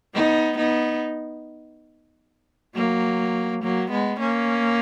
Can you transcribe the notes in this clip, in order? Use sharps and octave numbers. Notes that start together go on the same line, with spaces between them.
B3 D#4
B3 D#4
F#3 A#3
F#3 A#3
G#3 B3
A#3 C#4